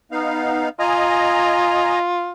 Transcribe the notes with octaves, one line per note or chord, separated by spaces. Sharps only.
B3 D#4 F5
F4 D#5 G#5 A#5